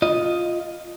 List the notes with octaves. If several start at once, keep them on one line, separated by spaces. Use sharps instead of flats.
F4 D#5